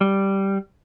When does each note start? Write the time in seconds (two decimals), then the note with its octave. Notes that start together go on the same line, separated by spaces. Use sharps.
0.01 G3